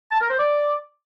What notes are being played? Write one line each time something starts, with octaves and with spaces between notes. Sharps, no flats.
A5
A#4
C5
D5